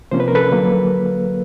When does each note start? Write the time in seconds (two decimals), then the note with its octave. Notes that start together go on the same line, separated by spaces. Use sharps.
0.11 C3 F3 A#3 C#4 C5
0.20 B4
0.28 A#4
0.35 A4 B4
0.52 D3 F#3 A#3